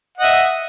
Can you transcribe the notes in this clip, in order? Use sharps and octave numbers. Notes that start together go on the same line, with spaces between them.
D#5 E5 F#5